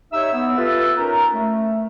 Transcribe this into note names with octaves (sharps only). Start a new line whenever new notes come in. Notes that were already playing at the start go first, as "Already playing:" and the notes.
D#4 G4 C#5 E5 E6
B3
F4 G4 A4 B4 E5
C#4 D#4 A#4 A#5
A3